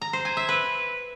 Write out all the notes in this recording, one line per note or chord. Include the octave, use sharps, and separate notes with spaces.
A#5
C5
G#5
E5
B4